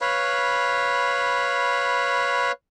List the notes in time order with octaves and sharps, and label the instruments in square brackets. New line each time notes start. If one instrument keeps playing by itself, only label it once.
[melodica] B4 C#5 F5 B5